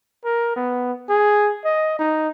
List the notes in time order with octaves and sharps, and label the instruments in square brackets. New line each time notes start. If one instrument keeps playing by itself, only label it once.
[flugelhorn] A#4
B3
G#4
D#5
D#4